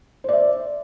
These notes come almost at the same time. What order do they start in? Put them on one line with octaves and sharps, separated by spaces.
C5 D5 E5